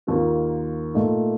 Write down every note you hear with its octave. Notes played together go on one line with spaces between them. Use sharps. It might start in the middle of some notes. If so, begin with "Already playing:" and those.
D#2 D#3 A#3 F4
A#2 A3 D#4